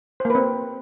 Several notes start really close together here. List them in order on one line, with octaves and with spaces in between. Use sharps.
C5 A#3 B4 C4